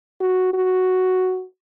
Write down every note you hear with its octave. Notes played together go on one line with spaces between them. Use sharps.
F#4
F#4